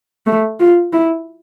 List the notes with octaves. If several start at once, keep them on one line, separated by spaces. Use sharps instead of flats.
A3
F4
E4